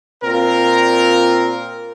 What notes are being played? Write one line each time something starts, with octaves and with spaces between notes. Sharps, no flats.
A#2 C4 F4 A#4